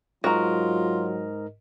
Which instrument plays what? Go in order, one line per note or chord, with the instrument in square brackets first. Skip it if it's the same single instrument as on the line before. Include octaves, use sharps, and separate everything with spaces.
[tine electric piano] G#2 A#4 D#5 [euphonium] F#3 [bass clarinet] F4 [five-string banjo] F#4 A#5